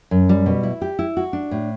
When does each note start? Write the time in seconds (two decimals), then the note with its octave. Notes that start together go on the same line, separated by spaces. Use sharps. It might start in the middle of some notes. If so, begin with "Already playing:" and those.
0.11 F#2
0.29 G3
0.46 B2
0.63 E4
0.82 G4
0.99 E4
1.17 F#4
1.33 D4
1.51 A2